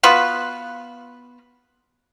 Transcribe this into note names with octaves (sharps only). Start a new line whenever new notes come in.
B3 F4 F#4 B4